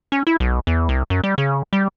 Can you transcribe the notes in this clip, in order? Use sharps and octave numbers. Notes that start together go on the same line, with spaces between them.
C#4
E4
B1
E2
C2
F#2
G3
C#3
G3